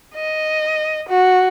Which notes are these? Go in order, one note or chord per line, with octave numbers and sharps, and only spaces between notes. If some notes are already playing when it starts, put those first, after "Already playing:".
D#5
F#4